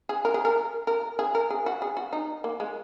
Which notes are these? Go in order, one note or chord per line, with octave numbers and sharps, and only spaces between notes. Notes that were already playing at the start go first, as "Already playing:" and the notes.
G#4
A#4
G#4
A#4
A#4
G#4
A#4
G#4
F#4
G#4
F#4
D#4
A#3
G#3